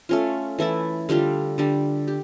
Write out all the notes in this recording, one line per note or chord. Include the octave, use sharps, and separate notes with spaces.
A3 C#4 F4
E3 A3 E4 A4
D3 G3 D4 F4
D3 G3 D4
G4